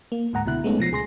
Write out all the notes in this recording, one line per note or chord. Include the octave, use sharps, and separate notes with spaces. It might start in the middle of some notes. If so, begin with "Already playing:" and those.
A#3
D2 G#2 F#5 A#5
C#2 B2 D3 E4 F#6
G#3 A3 B3 C#4 D#4
B2 F3 A#6 C7
C#2 G#4 C6 A#6